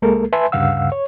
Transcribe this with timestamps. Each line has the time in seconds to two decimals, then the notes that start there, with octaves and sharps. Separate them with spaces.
0.02 C2 G#3 A#3 A4 A#4
0.33 B4 E5 G#5 A5 C6
0.52 D2 G2 C#3 F5 F#5 E6
0.92 C#5